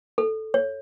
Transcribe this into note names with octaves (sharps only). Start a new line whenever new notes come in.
A4
C#5